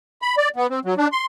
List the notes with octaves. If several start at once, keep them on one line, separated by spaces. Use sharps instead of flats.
B5
D5
B3
C4
F#3
D4
C6